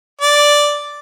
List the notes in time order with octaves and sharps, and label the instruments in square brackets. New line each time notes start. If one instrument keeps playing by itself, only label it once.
[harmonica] D5